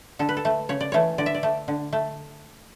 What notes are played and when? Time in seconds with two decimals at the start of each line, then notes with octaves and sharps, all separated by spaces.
0.19 D3 A4
0.29 B4
0.37 A4
0.45 A3
0.69 C#3 C#5
0.81 D5
0.92 E3 A3 C#5
1.18 D3 D5
1.26 E5
1.34 D5
1.43 A3
1.68 D3
1.93 A3